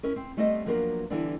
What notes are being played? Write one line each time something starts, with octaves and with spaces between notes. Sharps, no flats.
C#4 E4 A#4 B4
C4
G3 A3 B3 C4 D#5
F3 F#3 A#3 B3 D4 A#4
D3 E3 G3 B3 C4 D4